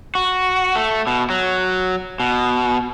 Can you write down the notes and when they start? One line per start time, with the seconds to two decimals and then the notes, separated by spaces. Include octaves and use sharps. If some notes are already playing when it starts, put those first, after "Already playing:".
0.15 F#4
0.76 A3
1.07 B2
1.30 F#3
2.20 B2